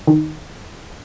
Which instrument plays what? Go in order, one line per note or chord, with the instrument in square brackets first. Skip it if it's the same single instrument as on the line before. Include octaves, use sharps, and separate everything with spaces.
[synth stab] D#3